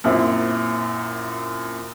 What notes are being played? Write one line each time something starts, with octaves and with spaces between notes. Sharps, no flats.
F#2 A#2 C4 E4